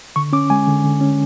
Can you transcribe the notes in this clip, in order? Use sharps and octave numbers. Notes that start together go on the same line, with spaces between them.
D3 C#6
C#4 D6
G#3 G#5
D3
D3
C#4